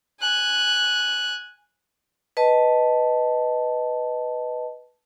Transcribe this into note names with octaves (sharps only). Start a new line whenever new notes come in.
G#5 F#6
B4 D#5 A5